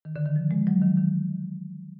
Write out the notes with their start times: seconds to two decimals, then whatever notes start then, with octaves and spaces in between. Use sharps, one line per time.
0.05 D#3
0.16 D3
0.25 D#3
0.36 F3
0.51 G#3
0.67 F#3
0.81 D#3
0.97 D#3